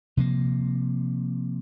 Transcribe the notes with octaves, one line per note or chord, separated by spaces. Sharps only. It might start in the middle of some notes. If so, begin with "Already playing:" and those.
C3 F3 A#3